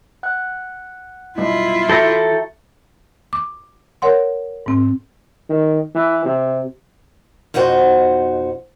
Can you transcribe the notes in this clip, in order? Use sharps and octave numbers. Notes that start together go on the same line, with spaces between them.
F#5 F#6
B1 G2 E4 F4 D#5
E3 F#4 A4 E5 G5 A#5 C#7
D6
A#4 C#5 F#5 C6
G#2 C4
D#3
E3
C3
F2 B2 D#4 F#4 C5